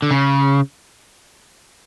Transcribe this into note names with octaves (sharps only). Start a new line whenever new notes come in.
D3
C#3